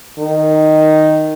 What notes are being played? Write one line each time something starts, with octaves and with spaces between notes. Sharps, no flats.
D#3